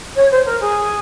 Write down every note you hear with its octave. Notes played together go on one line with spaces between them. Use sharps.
C#5
C5
A#4
G#4